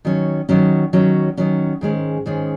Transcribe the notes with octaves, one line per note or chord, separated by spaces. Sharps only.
D#3 F#3 C#4
D#3 F#3 C#4
D#3 F#3 C#4
D#3 F#3 C#4
G#2 D#3 G#3 C#4
G#2 D#3 G#3 C#4